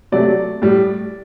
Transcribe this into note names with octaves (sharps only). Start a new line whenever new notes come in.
C3 F#3 A3 D5
A2 G3